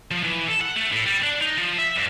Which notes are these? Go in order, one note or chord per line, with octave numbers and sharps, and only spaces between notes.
F3
E3
A4
F#5
A3
A2
G3
D4
D#4
F3
E5
G2